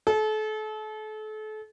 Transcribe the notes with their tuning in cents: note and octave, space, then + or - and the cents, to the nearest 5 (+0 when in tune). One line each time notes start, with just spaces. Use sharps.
A4 -35